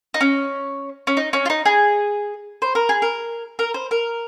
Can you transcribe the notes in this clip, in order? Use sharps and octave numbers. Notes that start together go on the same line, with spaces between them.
D#4
C#4
C#4
D#4
C#4
F4
D#4
G#4
C5
A#4
G#4
A#4
A#4
C5
A#4